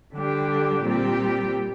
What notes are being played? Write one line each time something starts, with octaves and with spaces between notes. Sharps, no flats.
D3 G3 D4 G4
A#2 G3 C4 G4